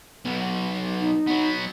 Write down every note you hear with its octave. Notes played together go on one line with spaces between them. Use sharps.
B1 B2
D#4
F#3 B3